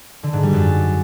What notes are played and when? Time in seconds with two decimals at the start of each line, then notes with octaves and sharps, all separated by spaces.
0.23 D3
0.33 G#2
0.43 G3
0.53 F#2